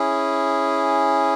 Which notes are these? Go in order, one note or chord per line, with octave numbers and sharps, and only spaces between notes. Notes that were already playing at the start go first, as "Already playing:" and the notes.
Already playing: C#4 E4 G#4